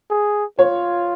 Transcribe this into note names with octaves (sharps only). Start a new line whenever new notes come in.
G#4
F4 C#5